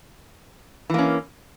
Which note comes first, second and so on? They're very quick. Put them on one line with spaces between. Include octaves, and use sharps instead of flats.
E3 A#3 C#4